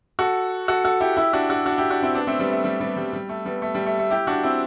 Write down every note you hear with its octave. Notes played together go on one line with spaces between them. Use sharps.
F#4 A4
F#4 A4
F#4 A4
E4 G4
E4 G4
D4 F#4
D4 F#4
D4 F#4
E4 G4
D4 F#4
C4 E4
B3 D4
A3 C4
G3 B3
A3
G3
G3 B3
G3
G3
A3
G3 B3
A3
G3
A3
A3
E4 G4
D4 F#4
C4 E4